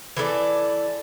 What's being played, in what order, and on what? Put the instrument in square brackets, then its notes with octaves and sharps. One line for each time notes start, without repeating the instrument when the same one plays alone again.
[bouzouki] E3 A4 A#4 D5